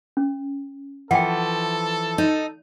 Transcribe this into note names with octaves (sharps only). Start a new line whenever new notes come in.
C#4
E3 F3 A4 F#5 G5
D#4